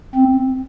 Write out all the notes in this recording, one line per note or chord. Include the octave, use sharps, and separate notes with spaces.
C4